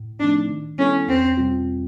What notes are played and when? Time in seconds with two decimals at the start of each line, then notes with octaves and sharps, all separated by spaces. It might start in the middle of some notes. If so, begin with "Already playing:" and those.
Already playing: A2
0.20 F3 A3 C4 D4 D#4
0.49 D#3
0.78 G3 B3 C#4 E4 A4
1.08 E2 C4
1.37 B2 G3 C4 F4